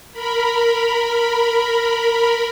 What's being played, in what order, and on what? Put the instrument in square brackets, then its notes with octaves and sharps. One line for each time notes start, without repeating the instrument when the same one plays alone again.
[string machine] A#4 B5